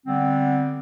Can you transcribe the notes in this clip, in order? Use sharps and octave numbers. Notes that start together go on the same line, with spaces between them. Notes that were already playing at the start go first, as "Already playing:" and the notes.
D3 G3 B3 C4